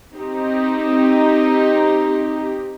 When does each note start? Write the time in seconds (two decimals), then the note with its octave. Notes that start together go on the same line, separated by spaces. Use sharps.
0.15 C4 D#4 G4